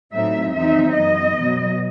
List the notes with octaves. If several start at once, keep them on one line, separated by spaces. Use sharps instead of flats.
A2 F#3 A3 C4 D#4 E5
E2 D#3 F#3 C4 D#4 E5
F#2 E3 B3 D#5
B2 F#3 B3